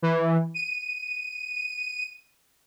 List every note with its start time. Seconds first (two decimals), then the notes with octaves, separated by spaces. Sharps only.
0.02 E3
0.54 D#7